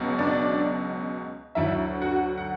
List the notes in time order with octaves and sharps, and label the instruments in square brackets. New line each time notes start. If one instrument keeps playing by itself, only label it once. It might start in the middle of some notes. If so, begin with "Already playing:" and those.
Already playing: [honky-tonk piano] C#2 B2 F#3
D4 D5
D2 D3 F#3 E4 E5
F#4 F#5
F#5